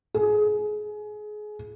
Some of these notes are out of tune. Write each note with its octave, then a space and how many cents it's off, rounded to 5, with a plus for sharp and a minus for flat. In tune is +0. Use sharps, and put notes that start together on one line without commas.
G#4 +25